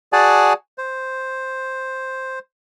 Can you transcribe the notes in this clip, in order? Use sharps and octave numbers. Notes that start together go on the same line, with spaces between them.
F#4 G#4 D5 F#5 G#5 A5
C5